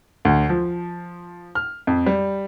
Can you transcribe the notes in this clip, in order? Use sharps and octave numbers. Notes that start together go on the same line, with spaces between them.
D2
F3
F6
F2
G3